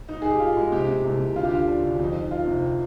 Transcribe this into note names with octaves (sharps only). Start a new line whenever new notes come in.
G#2 D#4
G#2 G#4
G4
G#2 F4
G#3
C3 G4
C3
C2
C2
D2 F4
G4
D3 F4
D3 D4
D2
F2 D#4
D#3
D#3 F4
C3